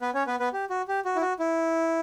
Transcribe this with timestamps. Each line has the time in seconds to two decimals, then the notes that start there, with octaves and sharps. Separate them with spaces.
0.01 B3 B4
0.14 C#4 C#5
0.27 B3 B4
0.40 B3 B4
0.53 G4
0.70 F#4
0.88 G4
1.05 F#4
1.16 E4
1.21 F#4
1.39 E4